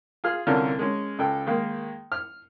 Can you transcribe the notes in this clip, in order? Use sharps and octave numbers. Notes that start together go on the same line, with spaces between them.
F4 G#4 F6
C2 D3 C#4 F4 A#4 F6
G#3 C#4
C#2 A4 G5
D#3 G#3 A#3
F6